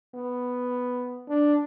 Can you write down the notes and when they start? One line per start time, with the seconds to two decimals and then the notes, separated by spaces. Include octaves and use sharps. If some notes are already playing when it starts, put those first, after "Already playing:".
0.15 B3
1.28 D4